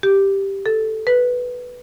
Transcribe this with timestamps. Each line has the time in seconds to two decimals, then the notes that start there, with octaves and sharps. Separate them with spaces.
0.03 G4
0.66 A4
1.07 B4